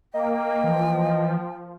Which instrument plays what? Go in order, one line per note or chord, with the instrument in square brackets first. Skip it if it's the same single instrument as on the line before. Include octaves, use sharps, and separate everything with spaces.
[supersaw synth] A#3 [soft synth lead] D#5 [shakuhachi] G5
[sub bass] E3 [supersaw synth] F3